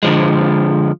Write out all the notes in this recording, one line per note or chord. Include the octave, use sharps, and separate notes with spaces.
D3 F3 G#3